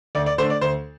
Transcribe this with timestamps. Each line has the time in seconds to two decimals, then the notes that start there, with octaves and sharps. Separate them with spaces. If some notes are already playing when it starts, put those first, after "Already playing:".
0.15 D2 D5
0.26 D5
0.38 D3 A3 D4 C5
0.50 D5
0.61 D2 C5